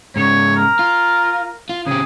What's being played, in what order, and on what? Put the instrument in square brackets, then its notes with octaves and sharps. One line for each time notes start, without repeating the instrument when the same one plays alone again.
[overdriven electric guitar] G#2 C#3 [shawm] C#5
[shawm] A#4
[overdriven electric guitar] F4
F4
[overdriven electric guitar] C#3 G4 [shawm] G#4